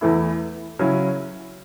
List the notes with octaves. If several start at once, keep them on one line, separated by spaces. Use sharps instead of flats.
E2 E3 A3 E4
C#3 F#3 C#4 E4